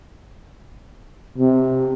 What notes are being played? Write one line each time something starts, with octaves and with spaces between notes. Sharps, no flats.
C3